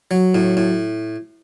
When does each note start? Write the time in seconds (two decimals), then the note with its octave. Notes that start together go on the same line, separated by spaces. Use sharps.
0.11 F#3
0.35 A2
0.57 A2